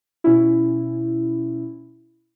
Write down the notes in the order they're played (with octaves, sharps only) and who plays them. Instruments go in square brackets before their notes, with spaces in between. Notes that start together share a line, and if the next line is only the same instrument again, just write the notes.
[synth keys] B2 C#4 E4